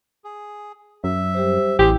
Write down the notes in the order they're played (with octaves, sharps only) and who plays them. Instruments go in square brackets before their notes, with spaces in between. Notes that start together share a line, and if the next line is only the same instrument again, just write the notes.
[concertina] G#4
[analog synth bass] F#2 [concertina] E5
[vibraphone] G3 G4 C5
[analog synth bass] A1 [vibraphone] E4 G5 [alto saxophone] G4 [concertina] G#4 C5